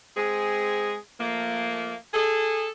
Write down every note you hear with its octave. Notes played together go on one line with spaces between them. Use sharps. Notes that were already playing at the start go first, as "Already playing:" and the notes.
G#3 C4 G#4
F3 A3 A#3
G#4 A4